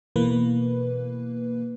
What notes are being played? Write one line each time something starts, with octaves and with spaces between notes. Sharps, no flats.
B2 E3 A#3 B4